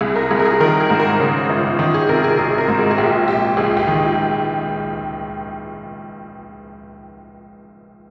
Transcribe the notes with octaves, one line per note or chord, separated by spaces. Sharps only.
C2 G#4
A#4
C2 G#4
A#4
G#4
D#3 A#4
G#4
G#2
A#4
C#3
G1
D#3
G#4
C3 A#4
G#4
G#1 G#4
A#4
G#2
G#4
G#4
A#1 G4
A#1 G4
C#2 G#4
G4
D#3